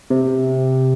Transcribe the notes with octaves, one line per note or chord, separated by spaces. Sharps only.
C3